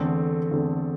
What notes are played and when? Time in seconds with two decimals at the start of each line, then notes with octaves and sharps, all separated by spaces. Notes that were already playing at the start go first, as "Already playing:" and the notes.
Already playing: E2 D3 A3 C4
0.51 E2 D3 A3 C4